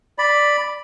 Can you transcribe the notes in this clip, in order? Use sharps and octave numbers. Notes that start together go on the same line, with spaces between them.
D5 B5